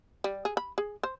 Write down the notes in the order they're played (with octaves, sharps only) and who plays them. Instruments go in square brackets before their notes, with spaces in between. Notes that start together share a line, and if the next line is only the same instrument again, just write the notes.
[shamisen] G3
G#4
B5
G#4
C5